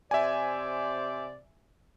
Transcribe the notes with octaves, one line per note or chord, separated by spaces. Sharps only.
C3 C5 D5 E5 G#5